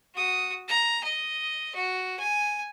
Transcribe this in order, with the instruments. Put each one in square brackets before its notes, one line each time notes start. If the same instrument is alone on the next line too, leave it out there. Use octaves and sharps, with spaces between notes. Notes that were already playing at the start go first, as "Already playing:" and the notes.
[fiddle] F#4 D#6
A#5
D#5
F#4
G#5